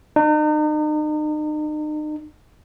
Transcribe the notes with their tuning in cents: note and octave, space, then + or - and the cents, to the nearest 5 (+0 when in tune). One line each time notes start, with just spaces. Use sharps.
D#4 -40